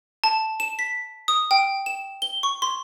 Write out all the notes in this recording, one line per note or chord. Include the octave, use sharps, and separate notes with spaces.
A5
E7
B6
D#6
G5
E7
G7
C#6
C6